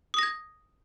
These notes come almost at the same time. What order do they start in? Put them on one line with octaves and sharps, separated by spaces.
D#6 A#6 G#6